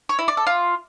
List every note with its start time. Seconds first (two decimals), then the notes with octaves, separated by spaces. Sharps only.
0.09 C#5
0.19 E4
0.28 D5
0.37 A4
0.47 F4